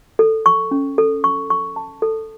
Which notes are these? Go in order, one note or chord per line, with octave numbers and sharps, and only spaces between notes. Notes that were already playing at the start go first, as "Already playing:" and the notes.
A4
C#6
C#4
A4
C#6
C#6
A5
A4